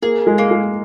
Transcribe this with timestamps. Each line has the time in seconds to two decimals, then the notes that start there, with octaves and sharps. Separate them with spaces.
0.02 A#3 G#4
0.27 G#3
0.38 A#3
0.51 G#3